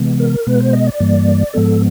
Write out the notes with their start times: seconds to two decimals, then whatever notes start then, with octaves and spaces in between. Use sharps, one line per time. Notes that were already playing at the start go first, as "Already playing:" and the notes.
Already playing: C3 E3 G#3 B3
0.20 A#4
0.47 B2 G#3 B3 B4
0.60 C5
0.73 D#5
0.87 D5
1.00 G2 E3 G3 A#3
1.54 G#2 F3 G#3 B3 A4